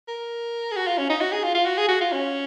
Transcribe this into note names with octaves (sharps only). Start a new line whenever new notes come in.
A#4
G#4
F#4
F4
C#4
D#4
F#4
G#4
F4
F4
F#4
G#4
F#4
F4
C#4